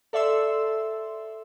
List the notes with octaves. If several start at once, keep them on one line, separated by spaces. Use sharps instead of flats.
A4 D5 E5 C6 E6